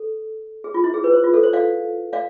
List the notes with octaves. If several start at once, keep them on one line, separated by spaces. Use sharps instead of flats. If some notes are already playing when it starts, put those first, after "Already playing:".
Already playing: A4
G#4
F4
E4
G#4
B4
C5
F4
A4
C5
D5 F5
D5 F5